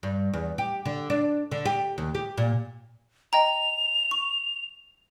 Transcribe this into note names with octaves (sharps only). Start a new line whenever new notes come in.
G2
E2
G4
D3
D4
D3
G4
D#2
G4
A#2
D#5 G5 A#5 F7
C#6